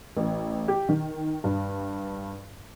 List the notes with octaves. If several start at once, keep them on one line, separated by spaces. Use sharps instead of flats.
A1
G4
D#3
G2